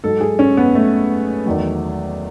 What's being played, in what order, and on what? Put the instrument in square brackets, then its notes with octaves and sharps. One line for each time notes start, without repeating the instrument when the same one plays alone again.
[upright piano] G#2 F#3 A4
G#4
C#4
B3
A3
E2 D#3 F#3